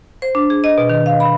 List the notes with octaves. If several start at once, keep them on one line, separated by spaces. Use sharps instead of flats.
C5
D4
G#4
D#5
B2
D#3
F5
B5